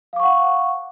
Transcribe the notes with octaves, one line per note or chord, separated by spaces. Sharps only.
F5 F#5 C#6 D6